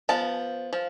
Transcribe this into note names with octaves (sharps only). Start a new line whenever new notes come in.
F3 B3 A5
F3